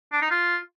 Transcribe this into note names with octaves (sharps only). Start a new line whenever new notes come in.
D4
D#4
F4